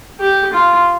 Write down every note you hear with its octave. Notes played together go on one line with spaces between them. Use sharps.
G4
F4